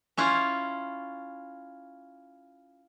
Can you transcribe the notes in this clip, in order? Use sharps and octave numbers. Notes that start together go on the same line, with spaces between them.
C#4 E4 F4